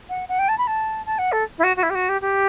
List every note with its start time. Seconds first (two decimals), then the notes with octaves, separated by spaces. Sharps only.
0.09 F#5
0.28 F#5
0.39 G5
0.48 A5
0.58 B5
0.67 A5
1.05 A5
1.18 F#5
1.32 A4
1.58 E4
1.63 F#4
1.76 F#4
1.82 E4
1.90 G4
1.94 F#4
2.08 G4
2.21 G4